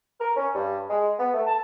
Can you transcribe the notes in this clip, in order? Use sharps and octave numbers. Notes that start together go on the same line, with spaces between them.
A#4
C#4
G2
G#3
B3
A3
A5